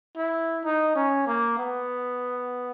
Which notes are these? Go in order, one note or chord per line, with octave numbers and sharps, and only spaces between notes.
E4
D#4
C#4
A#3
B3